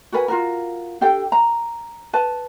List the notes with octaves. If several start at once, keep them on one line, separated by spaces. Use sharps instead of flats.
F#4 A#4 B4 G#5
F4 F#4 A#4
D4 G4 A4 G5
A#5
B4 A5